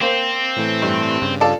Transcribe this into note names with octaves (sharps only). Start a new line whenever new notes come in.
A#3 C4 C5
A2 E3 A3
G2
G2 C#3
F4 A4 D5